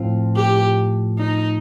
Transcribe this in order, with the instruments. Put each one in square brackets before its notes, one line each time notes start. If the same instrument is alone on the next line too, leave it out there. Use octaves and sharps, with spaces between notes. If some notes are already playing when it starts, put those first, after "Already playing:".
Already playing: [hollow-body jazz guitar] A2 F3 C4 F4
[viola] G4
D#4